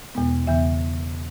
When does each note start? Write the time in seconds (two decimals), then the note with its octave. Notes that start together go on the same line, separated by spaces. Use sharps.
0.15 E2 B2 G#3 B3
0.47 E2 C#3 E3 B3 E5